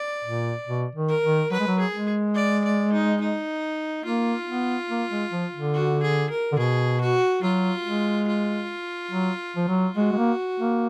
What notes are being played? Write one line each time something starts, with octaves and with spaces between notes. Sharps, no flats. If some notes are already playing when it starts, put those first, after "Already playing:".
Already playing: D5
A#2
B2
D#3
A#4
D#3
F#3 B4
G#3
F#3
G#4
G#3
D5
D5
D#4
D#4
A#3 F4
B3
A#3
G#3
F3
D3
F#4
G#4
A#4
D3
B2 G#4
F#4
F#3 F4
G#3
F4
F#3
F3
F#3
G#3 F#4
G#3
A#3
A#3